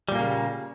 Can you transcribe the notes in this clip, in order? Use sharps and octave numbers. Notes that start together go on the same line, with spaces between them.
A#2 C#3 G3 A#3